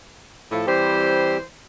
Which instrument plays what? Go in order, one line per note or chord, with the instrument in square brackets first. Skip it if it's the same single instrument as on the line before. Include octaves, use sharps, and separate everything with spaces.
[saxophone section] A2 F3 A4
[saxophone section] E3 C5 [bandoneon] G3 C4 G4